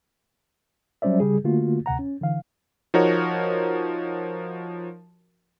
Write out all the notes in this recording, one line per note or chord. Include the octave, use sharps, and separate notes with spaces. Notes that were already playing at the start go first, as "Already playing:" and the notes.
F#3 G3 C#4 C5 D5 E5
C#3 G3 G#4
D3 A3 A#3 F4 F#4
D2 C3 F#5 A#5
C#4
D3 E3 F5
F3 D#4 F#4 A#4 C#5